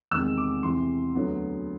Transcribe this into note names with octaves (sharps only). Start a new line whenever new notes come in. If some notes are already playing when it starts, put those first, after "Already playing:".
E2 C3 D#3 G#3 E6
D6
E2 C3 E3 C6
D2 D3 F#3 B3